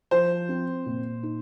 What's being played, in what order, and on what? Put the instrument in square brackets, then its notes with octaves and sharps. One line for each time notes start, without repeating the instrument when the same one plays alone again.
[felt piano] F3 [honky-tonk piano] C5
[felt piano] C4
A#2
D#4